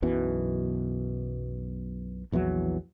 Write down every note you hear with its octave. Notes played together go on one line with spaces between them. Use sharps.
B1 F#2 B2 E3
A#1 E2 E3 F#3